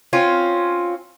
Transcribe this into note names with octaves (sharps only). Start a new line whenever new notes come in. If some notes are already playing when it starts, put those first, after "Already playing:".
C4 C#4 F4